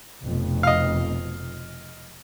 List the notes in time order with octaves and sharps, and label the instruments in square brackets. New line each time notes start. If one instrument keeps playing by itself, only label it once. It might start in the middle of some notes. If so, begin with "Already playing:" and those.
[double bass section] F1 F2 B2
[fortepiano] D#5 F5